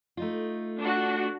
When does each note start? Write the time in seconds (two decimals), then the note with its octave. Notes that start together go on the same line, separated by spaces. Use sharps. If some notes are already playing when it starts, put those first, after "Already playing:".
0.17 A3 D#4 F4
0.79 D4 F#4